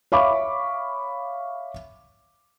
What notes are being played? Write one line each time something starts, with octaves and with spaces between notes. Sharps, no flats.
C#5 E5 F5 B5 C#6 D6